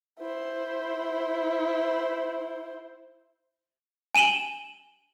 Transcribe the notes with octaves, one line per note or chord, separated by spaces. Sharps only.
E4 C5
G#5 D#7 E7 F#7 G7